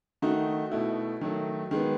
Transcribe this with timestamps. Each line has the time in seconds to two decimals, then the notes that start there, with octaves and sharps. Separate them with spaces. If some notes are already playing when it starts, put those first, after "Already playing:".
0.22 D#3 A3 D#4 F#4
0.72 B2 A3 E4
1.21 D#3 F#3 A3
1.71 D#3 G#3 B3